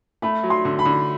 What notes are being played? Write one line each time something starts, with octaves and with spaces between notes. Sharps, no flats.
A3 B5
F#3
C6
D3
B5
D3